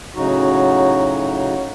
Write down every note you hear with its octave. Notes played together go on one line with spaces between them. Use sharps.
A2 C#3 F#3 D#4 F#4